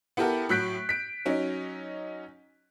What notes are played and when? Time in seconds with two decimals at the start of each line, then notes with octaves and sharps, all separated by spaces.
0.17 B3 E4 G4 A4 A#4 F#5
0.49 A2 F#3 F#6 G6 B6 D7
0.89 B6 D7
1.25 F#3 C#4 D#4